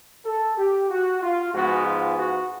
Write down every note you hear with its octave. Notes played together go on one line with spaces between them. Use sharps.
A4
G4
F#4
F4
G#2 F3 G#3 B3 F#4
F4
F#4